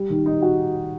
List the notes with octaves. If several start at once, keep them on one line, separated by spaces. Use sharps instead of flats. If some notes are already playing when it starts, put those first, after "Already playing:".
Already playing: G3
D#3
D#4
F#4